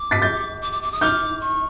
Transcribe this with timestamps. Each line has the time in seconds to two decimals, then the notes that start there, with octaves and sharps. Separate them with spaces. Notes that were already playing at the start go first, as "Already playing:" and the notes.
Already playing: D6
0.11 A6 B6
0.22 G6 A6
0.62 D6
0.72 D6
0.82 D6
0.92 D#6
1.01 D6 F6 G6
1.41 C#6